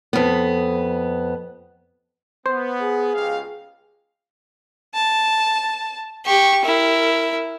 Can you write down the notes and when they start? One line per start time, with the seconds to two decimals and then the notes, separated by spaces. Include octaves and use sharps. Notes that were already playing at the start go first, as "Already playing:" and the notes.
0.13 F2 B3
2.46 B3 C5
2.81 G#4
3.14 C#2 G4 F5
4.94 A5
6.26 G4 C#6
6.65 E4 A#4